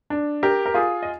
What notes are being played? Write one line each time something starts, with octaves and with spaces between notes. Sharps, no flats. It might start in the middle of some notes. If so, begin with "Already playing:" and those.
D4
G4 A#4
A#4
F4 G#4
D#5